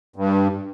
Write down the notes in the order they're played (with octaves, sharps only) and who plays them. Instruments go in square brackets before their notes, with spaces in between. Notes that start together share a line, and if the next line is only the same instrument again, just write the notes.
[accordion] G2